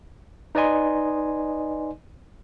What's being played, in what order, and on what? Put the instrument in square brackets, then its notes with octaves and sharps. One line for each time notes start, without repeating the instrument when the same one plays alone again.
[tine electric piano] D#4 B4 D5 D#5 G#5 C6